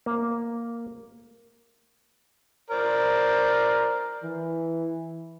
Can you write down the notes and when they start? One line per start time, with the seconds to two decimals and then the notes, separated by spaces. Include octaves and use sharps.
0.06 A#3
2.70 A#4 C5 D5
4.24 E3